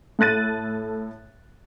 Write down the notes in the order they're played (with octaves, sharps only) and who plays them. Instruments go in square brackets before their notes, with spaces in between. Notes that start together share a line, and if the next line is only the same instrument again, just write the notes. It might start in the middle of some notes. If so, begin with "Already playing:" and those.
[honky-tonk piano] A2 A4 F#6 A6 D#7